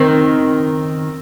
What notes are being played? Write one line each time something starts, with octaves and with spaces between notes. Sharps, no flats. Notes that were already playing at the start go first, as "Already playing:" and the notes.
Already playing: D#3 C4